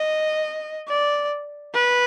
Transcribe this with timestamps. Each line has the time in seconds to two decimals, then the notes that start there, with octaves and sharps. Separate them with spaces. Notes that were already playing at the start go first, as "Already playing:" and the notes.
Already playing: D#5
0.88 D5
1.74 B4